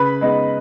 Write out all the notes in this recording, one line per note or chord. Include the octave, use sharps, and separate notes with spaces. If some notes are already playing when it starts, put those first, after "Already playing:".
Already playing: C#3 B4 B5
G#3 B3 D#4